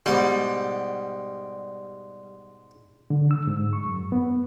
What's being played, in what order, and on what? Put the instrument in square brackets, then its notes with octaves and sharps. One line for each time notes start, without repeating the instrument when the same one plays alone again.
[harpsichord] G#2 B2 F#5 [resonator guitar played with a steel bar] G3
[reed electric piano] D3
E6
G#2
C#6
F#2
B3